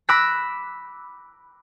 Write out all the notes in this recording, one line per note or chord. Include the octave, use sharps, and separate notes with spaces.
B5 D6 E6 F#6 A#6 B6